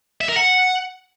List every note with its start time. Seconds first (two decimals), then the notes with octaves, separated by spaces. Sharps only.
0.21 E5
0.28 A#4
0.36 F#5